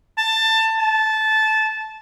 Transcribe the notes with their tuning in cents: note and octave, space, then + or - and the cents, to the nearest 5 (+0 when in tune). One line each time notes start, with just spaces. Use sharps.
A5 +20
A5 -15